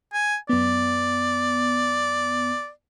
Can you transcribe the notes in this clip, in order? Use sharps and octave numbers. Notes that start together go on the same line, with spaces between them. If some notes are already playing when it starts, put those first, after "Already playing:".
G#5
F#2 B3 D5